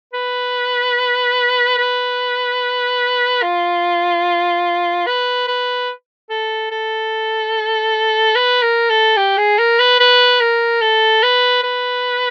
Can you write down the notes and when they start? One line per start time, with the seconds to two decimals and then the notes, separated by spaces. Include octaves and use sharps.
0.14 B4
1.78 B4
3.42 F4
5.07 B4
5.48 B4
6.30 A4
6.71 A4
8.36 B4
8.62 A#4
8.90 A4
9.17 G4
9.38 G#4
9.59 A#4
9.79 B4
10.00 B4
10.41 A#4
10.81 A4
11.23 B4
11.63 B4